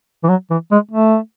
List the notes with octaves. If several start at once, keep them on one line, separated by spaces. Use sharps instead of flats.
E3
F#3
E3
G#3
A3